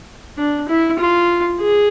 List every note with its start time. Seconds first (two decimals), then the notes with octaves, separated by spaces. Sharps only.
0.38 D4
0.68 E4
0.99 F4
1.60 G#4